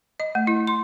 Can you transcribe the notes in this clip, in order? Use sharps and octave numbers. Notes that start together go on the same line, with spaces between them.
D#5
A3
E4
C6